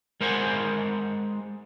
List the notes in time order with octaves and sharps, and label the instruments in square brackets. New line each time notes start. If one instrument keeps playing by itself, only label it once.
[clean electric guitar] G#3 A#4 C5 F#5 G#5